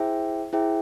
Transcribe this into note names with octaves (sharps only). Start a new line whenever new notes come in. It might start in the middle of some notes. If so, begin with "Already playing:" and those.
Already playing: E4 G#4 C5 E5 G5
E4 G#4 C5 E5 G5